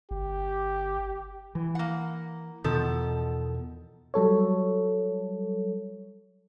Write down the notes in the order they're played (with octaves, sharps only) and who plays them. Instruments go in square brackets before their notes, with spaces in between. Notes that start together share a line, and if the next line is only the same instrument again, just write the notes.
[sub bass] G1 [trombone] G4
[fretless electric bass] E3
[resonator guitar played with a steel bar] A#3 F#5
[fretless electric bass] E2 B2 [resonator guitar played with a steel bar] D#3 F3 A4
[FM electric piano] F#3 G3 A4 C#5